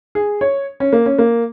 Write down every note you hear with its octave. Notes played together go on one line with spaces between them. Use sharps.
G#4
C#5
C#4
A#3
C#4
A#3